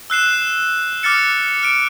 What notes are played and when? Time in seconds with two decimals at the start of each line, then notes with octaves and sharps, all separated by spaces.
0.10 E6 F#6 C7 E7
1.03 D6 F6 A6 C#7
1.63 F6 D7